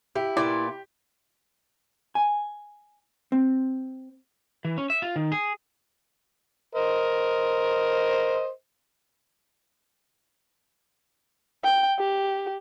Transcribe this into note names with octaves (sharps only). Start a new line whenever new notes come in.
E4 G4
A#2 B3 E4 D5
G#5
C4
E3
C#4
E5
F4
D#3
G#4
A#4 C5 D#5
G5
G4